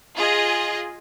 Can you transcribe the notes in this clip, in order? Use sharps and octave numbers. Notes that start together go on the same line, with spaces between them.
F4 G#4 D#5